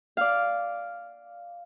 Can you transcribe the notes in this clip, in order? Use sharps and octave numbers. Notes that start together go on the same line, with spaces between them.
D5 F5